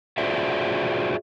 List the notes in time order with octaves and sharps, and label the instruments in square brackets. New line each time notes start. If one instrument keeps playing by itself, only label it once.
[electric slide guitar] F4 F#4 G#4 C5 D5 E5